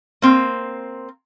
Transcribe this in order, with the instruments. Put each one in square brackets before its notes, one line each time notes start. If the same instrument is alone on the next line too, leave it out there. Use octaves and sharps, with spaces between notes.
[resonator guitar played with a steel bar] A#3 C4